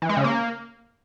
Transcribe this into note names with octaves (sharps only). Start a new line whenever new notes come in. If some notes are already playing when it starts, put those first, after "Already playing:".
E3
G#3
C#3
A#3